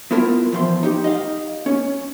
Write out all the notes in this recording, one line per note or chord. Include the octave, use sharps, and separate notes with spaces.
B3 E4 F4 A#4 A5
E2 F3 C6
D#4 G4
D#5 F5
C#4